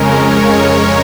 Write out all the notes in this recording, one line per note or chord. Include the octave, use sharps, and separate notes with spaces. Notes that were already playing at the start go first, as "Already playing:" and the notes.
Already playing: F2 C#3 G#3 C#4 A#4
C#5
C#5